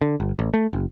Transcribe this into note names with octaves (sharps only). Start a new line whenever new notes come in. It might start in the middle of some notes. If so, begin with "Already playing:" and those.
D3
G1
A1
A3
F#1